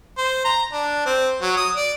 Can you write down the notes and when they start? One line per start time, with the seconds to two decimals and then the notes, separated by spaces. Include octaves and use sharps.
0.18 C5
0.45 A#5
0.73 D4
1.06 C4
1.42 F#3
1.57 D#6
1.76 D5